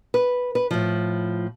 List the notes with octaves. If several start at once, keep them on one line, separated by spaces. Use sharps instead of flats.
B4
B4
A2 F3